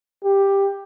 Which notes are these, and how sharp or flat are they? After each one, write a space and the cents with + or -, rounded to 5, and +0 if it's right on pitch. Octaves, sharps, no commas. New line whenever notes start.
G4 +10